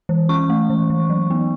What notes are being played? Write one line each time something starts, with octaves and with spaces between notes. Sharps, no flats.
E3
C#4 C#6
A3
E3
E3
F#3
B3